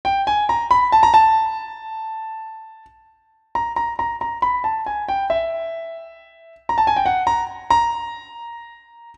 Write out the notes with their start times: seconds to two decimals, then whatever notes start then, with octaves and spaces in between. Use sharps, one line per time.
0.05 G5
0.27 G#5
0.49 A#5
0.71 B5
0.92 A5
1.03 A#5
1.14 A5
3.55 A#5
3.76 A#5
3.99 A#5
4.21 A#5
4.42 B5
4.64 A5
4.86 G#5
5.08 G5
5.30 E5
6.69 A#5
6.78 A5
6.87 G#5
6.96 G5
7.06 F#5
7.27 A#5
7.70 A#5